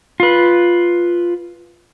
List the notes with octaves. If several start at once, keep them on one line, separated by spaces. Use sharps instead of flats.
F4 B4